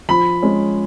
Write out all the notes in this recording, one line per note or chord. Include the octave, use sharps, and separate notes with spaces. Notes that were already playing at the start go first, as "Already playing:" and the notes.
F3 B5
G#3 C#4